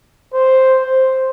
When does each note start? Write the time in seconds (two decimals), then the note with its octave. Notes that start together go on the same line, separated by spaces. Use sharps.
0.33 C5
0.80 C5